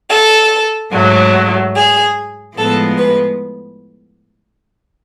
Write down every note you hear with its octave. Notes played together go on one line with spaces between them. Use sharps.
A4
G#2 F#3 A3
G#4
A2 F3 G#3 B3 A4
B4